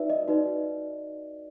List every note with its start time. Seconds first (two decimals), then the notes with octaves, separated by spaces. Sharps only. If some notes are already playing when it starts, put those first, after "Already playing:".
Already playing: D#4 F#4 B4 D5 E5
0.10 D#5
0.28 D#4 F#4 B4 D5